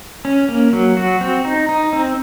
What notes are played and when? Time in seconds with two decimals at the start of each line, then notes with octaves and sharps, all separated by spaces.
0.25 C#4
0.49 A#3
0.73 F#3
0.97 F#4
1.21 C4
1.45 D#4
1.69 D#4
1.93 C4